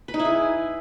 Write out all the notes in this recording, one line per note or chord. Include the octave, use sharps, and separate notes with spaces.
B4
D#4
E4
G#4